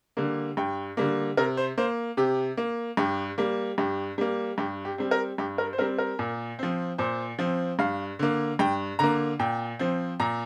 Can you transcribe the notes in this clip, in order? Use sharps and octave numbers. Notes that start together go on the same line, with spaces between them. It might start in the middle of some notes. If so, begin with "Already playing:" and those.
D3 G3 A#3
G2 G5
D3 G3 A#3
C3 A#4
C5
A#3 C5
C3 G4
A#3
G2 G4
G3 A#3
G2 G4
G3 A#3
G2 G4
G4
G3 C4
A#4
G2 G4
A#4
C5
G3 C4 A#4
A#4
A#2
F3 C4
A#2 C5
F3 C4
G2 F5
D3 A#3
G2 G5
D3 A#3 A#5
A#2 G5
F3 C4
A#2 A#5